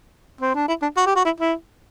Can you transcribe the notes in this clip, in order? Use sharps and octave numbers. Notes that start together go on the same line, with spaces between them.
C4
D4
E4
D4
F#4
G4
F#4
E4
E4